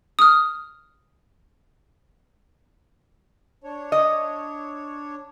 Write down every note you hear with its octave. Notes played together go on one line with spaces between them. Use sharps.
D#6 F6
D4 C#5
D#5